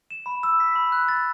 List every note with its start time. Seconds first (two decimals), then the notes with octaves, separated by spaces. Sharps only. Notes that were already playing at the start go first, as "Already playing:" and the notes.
0.10 E7
0.26 B5
0.43 E6
0.60 B6
0.75 B5
0.92 F#6
1.09 A6